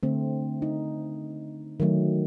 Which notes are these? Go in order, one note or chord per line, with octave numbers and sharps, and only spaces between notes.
D3 A3 C4
D#4
D#3 F#3 A3